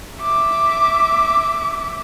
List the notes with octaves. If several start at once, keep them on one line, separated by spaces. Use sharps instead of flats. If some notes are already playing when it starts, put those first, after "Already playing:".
E5 D6